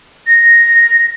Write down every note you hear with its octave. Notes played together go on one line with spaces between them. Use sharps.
A#6